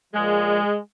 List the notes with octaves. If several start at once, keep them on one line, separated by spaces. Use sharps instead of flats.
A#2 F3 G#3